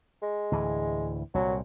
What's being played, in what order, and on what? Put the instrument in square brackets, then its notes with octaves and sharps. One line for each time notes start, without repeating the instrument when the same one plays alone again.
[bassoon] G#3
[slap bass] D2 A2 E3
[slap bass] C2 A#2 [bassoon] F#3